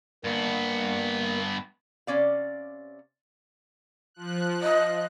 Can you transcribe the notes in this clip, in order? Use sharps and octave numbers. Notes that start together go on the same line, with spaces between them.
G2 A#3 B3
C3 C#4 D5 F5
F3 F#6
D#5